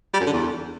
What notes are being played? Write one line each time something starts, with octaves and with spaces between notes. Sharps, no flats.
G3
F#2
D3
E2